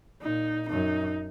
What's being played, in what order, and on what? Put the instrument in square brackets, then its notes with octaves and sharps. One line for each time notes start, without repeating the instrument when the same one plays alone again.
[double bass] A#2 [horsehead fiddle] D#4
[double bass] F#2 [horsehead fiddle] D#4